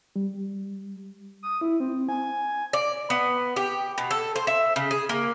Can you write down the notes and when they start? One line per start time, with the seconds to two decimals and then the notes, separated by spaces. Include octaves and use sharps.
0.16 G3
1.43 D#6
1.61 E4
1.80 C4
2.09 G#5
2.73 D5
3.10 B3
3.56 G4
3.98 B2
4.11 A4
4.36 C5
4.47 E5
4.76 C#3
4.91 G#4
5.09 A#3